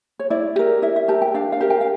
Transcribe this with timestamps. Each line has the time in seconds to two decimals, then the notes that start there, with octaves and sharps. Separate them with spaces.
0.19 C#5
0.30 E4 D5
0.56 G4 A#4
0.82 E4 E5
0.96 E5
1.08 G4 A#4 A5
1.22 G5
1.34 D4 F5
1.52 F5
1.61 G4 A#4
1.70 G5
1.81 F5